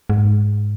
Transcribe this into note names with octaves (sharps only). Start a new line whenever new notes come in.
G#2